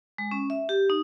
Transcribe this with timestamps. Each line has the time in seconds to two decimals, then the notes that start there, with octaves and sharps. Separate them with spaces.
0.18 G#3
0.31 C#4
0.50 E5
0.69 G4
0.90 D#4